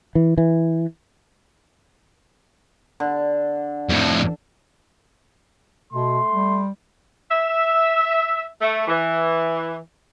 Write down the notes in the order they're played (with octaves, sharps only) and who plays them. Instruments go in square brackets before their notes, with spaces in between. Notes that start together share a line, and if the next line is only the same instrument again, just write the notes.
[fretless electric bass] E3
E3
[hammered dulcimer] D3
[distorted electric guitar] F2 A2
[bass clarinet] B2 [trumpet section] A3 C6
[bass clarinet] G3
[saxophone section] E5
A3
E3